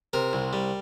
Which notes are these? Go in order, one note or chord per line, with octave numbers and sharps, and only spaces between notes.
C3 A#4
C2
G3